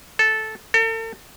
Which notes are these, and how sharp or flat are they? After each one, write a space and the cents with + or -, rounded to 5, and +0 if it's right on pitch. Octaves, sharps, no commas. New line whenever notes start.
A4 -10
A4 +40